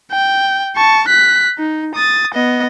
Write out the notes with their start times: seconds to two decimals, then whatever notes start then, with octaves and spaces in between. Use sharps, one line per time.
0.12 G5
0.76 A5 C#6
1.07 F#6 B6
1.59 D#4
1.95 D#6 A6
2.34 B3 D#5